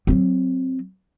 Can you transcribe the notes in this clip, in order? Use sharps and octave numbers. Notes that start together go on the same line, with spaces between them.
F#3 C4